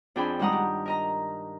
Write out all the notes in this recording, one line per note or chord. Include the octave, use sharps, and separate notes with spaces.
F2 D4 G#4 G5 G#5 B5
G2 D#3 G#3 F#5 A#5 D#6
G4
A#4 D#5 A#5